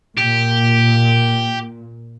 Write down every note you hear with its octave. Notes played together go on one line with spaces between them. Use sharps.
A#2 G4